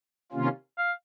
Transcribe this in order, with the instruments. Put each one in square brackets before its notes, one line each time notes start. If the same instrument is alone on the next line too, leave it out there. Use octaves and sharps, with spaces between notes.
[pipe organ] C3 D#3 A#3 C#4 F4
[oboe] F5